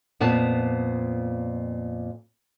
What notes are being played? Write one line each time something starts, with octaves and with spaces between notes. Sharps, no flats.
F2 A#2 B3 A5